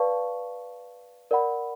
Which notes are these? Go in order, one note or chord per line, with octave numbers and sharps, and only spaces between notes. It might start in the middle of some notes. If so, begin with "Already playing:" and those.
Already playing: B4 D5 F5 A5 C#6
A#4 D5 F#5 B5